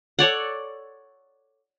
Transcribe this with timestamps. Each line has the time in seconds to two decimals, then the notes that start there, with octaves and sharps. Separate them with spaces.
0.19 A4 C#5 D5 F#5